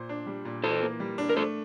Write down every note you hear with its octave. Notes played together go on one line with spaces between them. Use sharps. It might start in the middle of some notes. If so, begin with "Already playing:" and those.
Already playing: A#2 C5
D4
G3
A#2
E3 A4 C5
A#3
G3
D4
A#4
A3 A4 C5